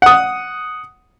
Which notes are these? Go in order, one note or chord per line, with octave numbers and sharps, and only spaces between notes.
F#5 D#6